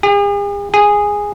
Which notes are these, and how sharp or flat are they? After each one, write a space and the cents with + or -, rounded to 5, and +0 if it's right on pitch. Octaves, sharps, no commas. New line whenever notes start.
G#4 -45
G#4 -10